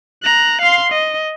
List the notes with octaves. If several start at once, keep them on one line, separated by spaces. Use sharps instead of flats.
A#5 F#6
F5 C6
D#5